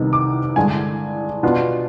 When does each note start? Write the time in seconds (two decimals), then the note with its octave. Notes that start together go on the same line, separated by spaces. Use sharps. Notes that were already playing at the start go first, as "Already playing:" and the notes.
Already playing: C2 C3 D#3 B3 D#4
0.13 D6
0.56 G2 D3 G#3 G#5
1.43 B2 B3 D4 F4